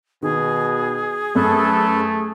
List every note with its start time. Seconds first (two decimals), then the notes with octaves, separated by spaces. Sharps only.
0.22 B2 D#3 G#4
1.36 F#2 A3 A4 B4